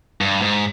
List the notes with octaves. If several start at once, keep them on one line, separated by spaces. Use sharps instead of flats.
G2
G#2